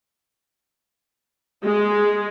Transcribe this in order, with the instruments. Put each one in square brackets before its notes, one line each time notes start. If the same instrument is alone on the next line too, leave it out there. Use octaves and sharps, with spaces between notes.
[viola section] G#3